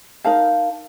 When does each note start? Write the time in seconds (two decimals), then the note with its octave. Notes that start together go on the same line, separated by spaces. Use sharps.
0.24 D#4 A#4 F5 A5